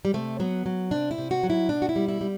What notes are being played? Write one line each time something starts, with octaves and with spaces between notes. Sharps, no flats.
G3
C3 A3
F#3 B3
F#3
C3 D4
E4
C3
F#4
F#3
E4
B2 D4
F#4
E4
G3
E4
G3